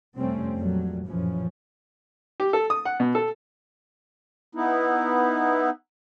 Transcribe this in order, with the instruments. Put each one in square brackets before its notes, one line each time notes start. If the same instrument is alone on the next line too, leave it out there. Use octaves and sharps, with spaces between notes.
[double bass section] F2 C3 G3 A3 C4 C#4
F2 A#2 F#3 G3 A3
A#1 F#2 A2 E3 F3 C#4
[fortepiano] G4
A4
D#6
F#5
B2
A4
[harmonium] B3 D#4 E4